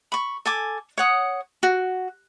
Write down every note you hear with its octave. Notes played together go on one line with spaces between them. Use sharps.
B5 C#6
A4 G#5 D6
C#5 F#5 D#6
F#4